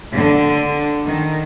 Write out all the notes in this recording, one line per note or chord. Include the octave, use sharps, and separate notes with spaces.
D3
D#3